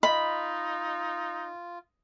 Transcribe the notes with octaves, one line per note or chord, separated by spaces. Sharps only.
D#4 F4 D#5 B5